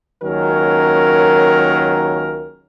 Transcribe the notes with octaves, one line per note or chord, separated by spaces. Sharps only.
C#2 D#3 F#3 A#3 C#4 A#4